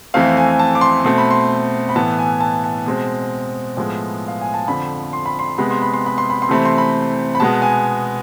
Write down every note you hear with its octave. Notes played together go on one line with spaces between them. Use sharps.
F2 E3 A3 C4 F5
G#5
A5
D6
C6
B2 A3 C4 C6
B5
C6
B5
A2 E3 B3 A5
G#5
A5
A5
B2 G#3 C4
A2 F3 G#3 B3
F5
G#5
A5
F2 D3 F3 B5
C6
B5
C6
C3 G#3 B3 B5
C6
B5
C6
B5
C6
B5
C6
C3 E3 A3 C4 B5
C6
B5
B5
B2 G#3 B3 A5
G#5